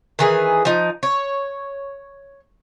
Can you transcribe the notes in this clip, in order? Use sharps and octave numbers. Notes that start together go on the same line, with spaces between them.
D#3 E3 G#4
F3 D#4
C#5